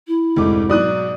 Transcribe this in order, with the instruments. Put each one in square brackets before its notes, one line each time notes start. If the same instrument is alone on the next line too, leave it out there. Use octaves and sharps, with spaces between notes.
[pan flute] E4
[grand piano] F1 G#2 [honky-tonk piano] D2 A3 D6
[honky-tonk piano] G#2 B2 [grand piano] F#3 [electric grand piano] D5 D#6 F#6